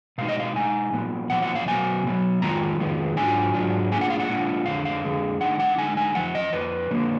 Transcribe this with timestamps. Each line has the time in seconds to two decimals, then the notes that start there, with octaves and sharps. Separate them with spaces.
0.18 B2 G#3 D#4 F5
0.28 D#5
0.40 F5
0.56 B2 G#3 D#4 G#5
0.93 A#2 F3 B3
1.30 A#2 F3 B3 F#5
1.42 F#5
1.55 F5
1.67 B2 F#3 B3 G#5
2.04 B2 F#3 B3
2.42 F2 D#3 G#3 F4 A#5
2.79 F2 D#3 G#3 B3 F4
3.16 G#2 F#3 D4 F4 G#5
3.54 G#2 F#3 D4 F4
3.91 A#2 G#3 D4 F4 G#5
4.01 F#5
4.10 F5
4.20 F#5
4.29 A#2 G#3 D4 F4
4.66 F2 D3 G#3 F5
4.85 F5
5.04 F2 D3 G#3
5.41 D3 G#3 D#4 F#5
5.59 F#5
5.78 D3 G#3 D#4 G#5
5.97 G#5
6.15 F2 F3 F#5
6.35 D#5
6.53 F2 F3 B4
6.91 D3 F3 A#3